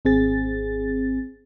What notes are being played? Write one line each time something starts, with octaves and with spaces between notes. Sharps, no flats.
G#1 C4 G#4 A6